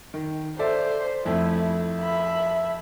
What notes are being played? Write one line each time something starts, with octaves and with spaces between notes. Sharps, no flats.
D#3
A4 C5 D5 E5
F2 A3 E4
E5 B5